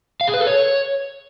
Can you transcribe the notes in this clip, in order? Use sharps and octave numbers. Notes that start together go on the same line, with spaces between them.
F5
G#4
B4
A4
C#5